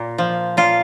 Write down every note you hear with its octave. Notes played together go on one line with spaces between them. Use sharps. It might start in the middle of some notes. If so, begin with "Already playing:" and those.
Already playing: A#2 A#3
F3
A#2 F4